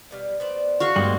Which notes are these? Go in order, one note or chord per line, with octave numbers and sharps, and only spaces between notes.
B2 G3 F5
B3 C5 D5
F#4 F5 C#6
G2 G3 G#3 A#3 C4